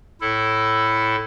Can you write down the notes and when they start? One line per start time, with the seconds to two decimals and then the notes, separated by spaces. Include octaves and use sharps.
0.21 A2 E4 A4